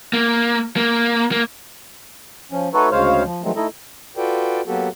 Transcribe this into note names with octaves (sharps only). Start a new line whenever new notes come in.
A#3
A#3
A#3
F3 C#4
A3 D#4 F#4 A4 B4 C#5
D2 C#3 G#3 C5 C#5 F5
F3
D#3 F3 F#3 G#3 A3 C4
A3 D#4 E4 A4 D#5
F4 F#4 A4 B4 D5 G5
F#3 A#3 B3 F#4 G4 A4